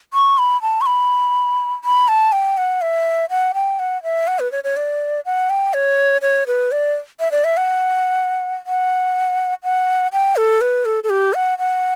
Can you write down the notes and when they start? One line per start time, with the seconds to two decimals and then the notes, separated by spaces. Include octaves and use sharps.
0.14 C#6
0.38 B5
0.62 A5
0.81 C#6
0.86 B5
1.84 B5
2.08 A5
2.32 G5
2.57 F#5
2.82 E5
3.30 F#5
3.54 G5
3.79 F#5
4.03 E5
4.27 F#5
4.39 B4
4.52 C#5
4.64 C#5
4.77 D5
5.26 F#5
5.50 G5
5.74 C#5
6.22 C#5
6.47 B4
6.72 D5
7.20 E5
7.32 D5
7.44 E5
7.57 F#5
8.66 F#5
9.64 F#5
10.13 G5
10.36 A4
10.61 B4
10.85 A4
11.04 A4
11.10 G4
11.34 F#5
11.59 F#5